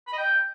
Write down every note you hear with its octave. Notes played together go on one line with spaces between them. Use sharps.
B5
D#5
G5